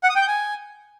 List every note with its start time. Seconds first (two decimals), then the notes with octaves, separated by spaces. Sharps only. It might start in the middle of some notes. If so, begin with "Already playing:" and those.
0.03 F#5
0.09 D#6
0.15 G5
0.21 G6
0.28 G#5